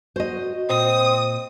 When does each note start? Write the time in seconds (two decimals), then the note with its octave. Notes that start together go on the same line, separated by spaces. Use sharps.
0.16 F#4 C5 D#5
0.69 A#2 C4 D#6